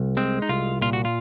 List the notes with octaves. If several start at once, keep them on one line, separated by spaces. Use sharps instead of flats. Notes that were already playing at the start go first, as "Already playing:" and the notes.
Already playing: C2
G#3 C4
D#4
C2 F4
A#2 F4
F#4
F4